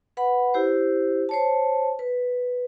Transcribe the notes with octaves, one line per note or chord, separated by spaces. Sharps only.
B4 F#5 B5
E4 G4 C5
C5 C#5 A5
B4